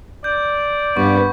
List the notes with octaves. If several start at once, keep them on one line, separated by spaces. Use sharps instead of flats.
D5 G6
G2 B3 C#6